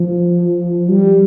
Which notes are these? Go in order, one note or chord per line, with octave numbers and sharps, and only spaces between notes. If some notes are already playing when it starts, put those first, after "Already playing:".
Already playing: F3
G3